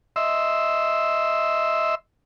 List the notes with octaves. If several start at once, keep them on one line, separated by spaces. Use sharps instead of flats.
D#5 E5 C6 E6